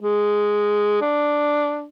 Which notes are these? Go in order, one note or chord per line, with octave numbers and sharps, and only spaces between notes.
G#3
D4